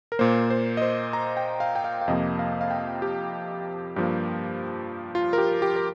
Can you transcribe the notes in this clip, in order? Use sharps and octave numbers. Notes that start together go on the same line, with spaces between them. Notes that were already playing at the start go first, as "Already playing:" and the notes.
A#4
A#2 A#3 C5
C5
D#5
C5
A#5
G5
F5
G5
F5
F5
F2 C3 F3 A#3 D#5
F5
F5
G5
G4
G2 F3 A#3 G4
F4
A#4
G4
G4
A#4